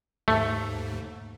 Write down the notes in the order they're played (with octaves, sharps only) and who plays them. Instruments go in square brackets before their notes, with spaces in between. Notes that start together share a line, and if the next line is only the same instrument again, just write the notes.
[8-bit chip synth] D#2 G#2 [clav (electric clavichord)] A3